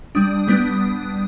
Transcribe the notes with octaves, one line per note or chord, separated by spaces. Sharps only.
G3 D4 D#6
G3 B3 D4